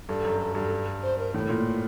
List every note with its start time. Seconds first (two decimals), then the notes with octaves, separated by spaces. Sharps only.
0.08 G2 A4
0.25 F#2
0.40 A4
0.55 G2 A4
1.03 C5
1.18 A#4
1.34 A2 A4
1.49 A#2